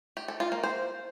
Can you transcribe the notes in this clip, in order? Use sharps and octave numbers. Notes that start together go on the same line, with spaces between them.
G4
A4
F4
A#3
C5